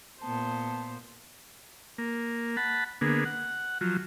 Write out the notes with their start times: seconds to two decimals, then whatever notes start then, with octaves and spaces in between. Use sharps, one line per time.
0.22 A#2 B3 C5 A5
1.98 A#3
2.57 F#5 A5 B5
3.01 D3 A#3 B3 G#4
3.25 F#5
3.81 F3 F#3